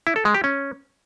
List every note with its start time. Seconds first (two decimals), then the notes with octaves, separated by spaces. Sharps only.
0.07 E4
0.16 A4
0.25 G#3
0.34 G4
0.44 C#4